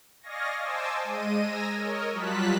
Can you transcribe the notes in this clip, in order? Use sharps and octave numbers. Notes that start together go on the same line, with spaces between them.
D5 D#5 F5 G#5 C#6 A#6
C5 D#5 G#5 A5 D6 E6
G#3 D#5 D#7
G#5 A#5 E6 A#6
A#4 C#5 D#5
F#3 G3 F4 A5 F#6 B6